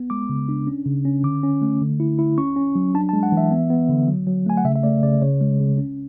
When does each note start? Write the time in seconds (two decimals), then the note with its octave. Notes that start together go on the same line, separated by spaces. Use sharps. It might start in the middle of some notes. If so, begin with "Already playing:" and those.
Already playing: B3
0.10 G#3 D6
0.30 C#3
0.49 D4
0.67 C#4
0.86 C#3
1.05 C#4
1.24 D3 D6
1.43 C#4
1.62 A3
1.81 D3
2.00 E4
2.19 E4
2.38 C#4 C#6
2.56 C#4
2.76 F#3
2.94 D4 A5
3.09 A5
3.13 G#3
3.23 F#5
3.32 E3
3.37 E5
3.51 B3
3.70 B3
3.89 D3
4.08 F#3
4.27 F#3
4.46 A3 G#5
4.57 F#5
4.65 C#3 E5
4.75 E5
4.83 A3 D5
5.03 C#3 D5
5.22 C#3 C#5
5.41 G#3
5.60 C#3
5.78 C#4